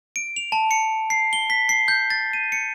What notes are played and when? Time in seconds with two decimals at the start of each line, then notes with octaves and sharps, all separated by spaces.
0.16 D7
0.36 F7
0.52 A5
0.71 C#7
1.10 C7
1.33 G7
1.50 B6
1.69 C7
1.88 G6
2.10 A6
2.33 D#7
2.52 C#7